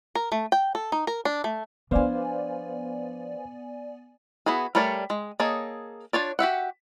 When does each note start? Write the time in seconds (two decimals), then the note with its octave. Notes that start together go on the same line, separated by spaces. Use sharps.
0.15 A#4
0.32 A3
0.52 G5
0.75 A4
0.92 D#4
1.07 A#4
1.25 D4
1.44 A3
1.91 F3 B3 D4 B4 C5 D5 F5 G#5
4.46 B3 E4 F#4 G#4
4.75 G3 A3 A#4 C#5 D5
5.10 G#3
5.40 A#3 G#4 A4 C#5 D#5
6.13 D4 F4 C#5 D5
6.39 F#4 G4 E5 F#5